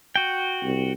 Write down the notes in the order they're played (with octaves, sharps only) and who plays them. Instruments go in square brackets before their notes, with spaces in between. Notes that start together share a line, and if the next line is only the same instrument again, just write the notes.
[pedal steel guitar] F#4 G5
[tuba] C2